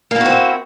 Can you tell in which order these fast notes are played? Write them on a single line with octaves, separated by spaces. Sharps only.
A#3 E4 F#4 C4